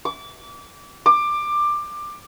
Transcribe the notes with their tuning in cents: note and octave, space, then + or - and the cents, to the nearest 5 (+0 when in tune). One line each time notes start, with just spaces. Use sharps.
D6 -30
D6 +15